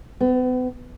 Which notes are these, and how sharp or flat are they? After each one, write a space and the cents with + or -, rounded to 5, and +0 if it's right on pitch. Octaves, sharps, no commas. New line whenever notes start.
B3 +40